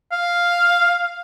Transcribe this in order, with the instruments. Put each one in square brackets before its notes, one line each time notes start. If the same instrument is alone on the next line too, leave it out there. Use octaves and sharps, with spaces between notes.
[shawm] F5